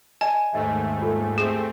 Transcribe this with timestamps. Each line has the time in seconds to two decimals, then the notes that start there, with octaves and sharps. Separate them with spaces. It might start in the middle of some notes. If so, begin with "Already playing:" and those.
0.21 D5 D#5 G#5 A5
0.52 D#2 G#2 A3 D#5 E5
1.01 F4 A4
1.38 A3 C4 G4 G#4